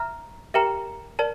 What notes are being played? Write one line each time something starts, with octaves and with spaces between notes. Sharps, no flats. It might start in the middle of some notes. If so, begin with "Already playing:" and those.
Already playing: E5 A#5 F6
G4 A#4 E5 G5 A#5
A#4 D5 A5